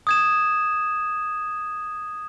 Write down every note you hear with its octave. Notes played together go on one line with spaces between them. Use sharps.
D#6 G#6 E7